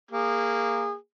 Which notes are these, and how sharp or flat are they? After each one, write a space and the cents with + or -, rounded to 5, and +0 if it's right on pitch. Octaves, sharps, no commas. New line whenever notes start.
A#3 -10 G#4 -30